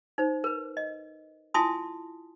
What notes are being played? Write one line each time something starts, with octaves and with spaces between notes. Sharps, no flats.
D#4 C5
A#4 B4
D#5
E4 F4 G#5 A5 C6 D#6